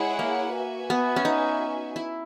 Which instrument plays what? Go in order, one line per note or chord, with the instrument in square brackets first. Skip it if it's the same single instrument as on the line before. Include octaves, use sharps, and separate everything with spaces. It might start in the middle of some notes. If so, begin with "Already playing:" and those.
Already playing: [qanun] G#3 [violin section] E4 G#4 C#5 F#5
[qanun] A#3
[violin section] F#4 B4 E5 G#5
[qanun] B3
C#4
D#4
E4